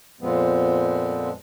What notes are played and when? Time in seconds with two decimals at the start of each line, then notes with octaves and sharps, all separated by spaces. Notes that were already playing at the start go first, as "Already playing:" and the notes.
0.21 F2 A#2 F3 G#3 B3 C4